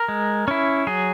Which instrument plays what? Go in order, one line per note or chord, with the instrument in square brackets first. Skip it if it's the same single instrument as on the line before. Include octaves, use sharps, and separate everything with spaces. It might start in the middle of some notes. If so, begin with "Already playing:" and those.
Already playing: [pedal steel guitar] A#4
G#3
C#4 E4
F#3 G#4